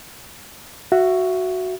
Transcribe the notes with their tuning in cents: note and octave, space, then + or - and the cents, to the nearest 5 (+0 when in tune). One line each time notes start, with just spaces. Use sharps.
F#4 +0 E5 +25